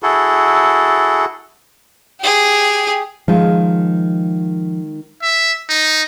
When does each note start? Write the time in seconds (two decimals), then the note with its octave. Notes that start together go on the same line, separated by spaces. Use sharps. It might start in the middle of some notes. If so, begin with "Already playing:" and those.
0.03 E4 F#4 G#4 A4
2.20 G4 G#4
3.28 D#3 F3 G#3 F4
5.22 E5
5.69 D#4